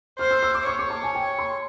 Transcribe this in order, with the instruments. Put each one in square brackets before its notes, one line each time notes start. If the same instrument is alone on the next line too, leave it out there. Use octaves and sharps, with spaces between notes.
[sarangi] C5 [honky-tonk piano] F6
[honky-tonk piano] E6
E6
D6
[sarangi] C#5 [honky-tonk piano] C#6
[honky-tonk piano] D6
A5
G#5
G5
C6